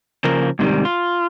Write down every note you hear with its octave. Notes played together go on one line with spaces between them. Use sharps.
C#3 F3 A#3 A#4
G#2 C3 D#3 G3
F4